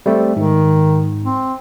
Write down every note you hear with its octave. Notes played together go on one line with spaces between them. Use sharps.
G3 A3 C4
G#2 D#3
C4